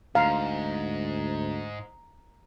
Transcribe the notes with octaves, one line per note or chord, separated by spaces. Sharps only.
D2 G#2 F5 A#5